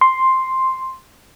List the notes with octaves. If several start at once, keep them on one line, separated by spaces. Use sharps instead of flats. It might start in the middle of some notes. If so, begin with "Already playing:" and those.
C6